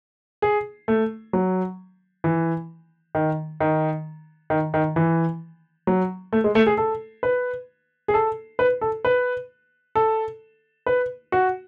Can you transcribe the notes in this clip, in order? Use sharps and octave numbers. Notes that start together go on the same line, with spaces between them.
G#4
A3
F#3
E3
D#3
D#3
D#3
D#3
E3
F#3
A3
G#3
A3
G#4
A4
B4
G#4
A4
B4
A4
B4
A4
B4
F#4